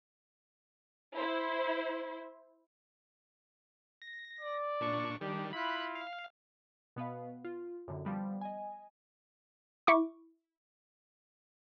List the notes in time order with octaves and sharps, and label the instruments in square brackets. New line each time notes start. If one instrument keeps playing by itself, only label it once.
[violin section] E4 C5
[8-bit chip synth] A#6
[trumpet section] D5
[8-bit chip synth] A#2 D4 C#6
[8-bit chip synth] D#3 G3 [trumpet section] D4 G4
[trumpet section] E4 F4 [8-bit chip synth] B5 F#6
[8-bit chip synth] F5
[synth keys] B2 B3 B4 F5
F4
F#2 A2 D3
F3 G3 B3
D#5 G#5
[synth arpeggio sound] E4 C#6 D6